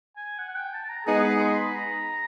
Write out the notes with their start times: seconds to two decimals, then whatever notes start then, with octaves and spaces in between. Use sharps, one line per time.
0.16 G#5
0.39 F#5
0.49 F#5
0.56 G5
0.74 A5
0.85 A5
0.89 A#5
1.07 G#3 B3 D#4 G#4 A#5
1.24 B5
1.40 C6
1.57 B5
1.75 A#5